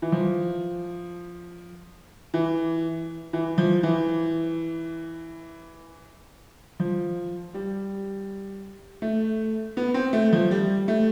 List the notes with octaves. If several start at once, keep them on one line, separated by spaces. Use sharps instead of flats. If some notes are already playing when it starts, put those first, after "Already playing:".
E3
F3
E3
E3
F3
E3
F3
G3
A3
B3
C4
A3
F3
G3
A3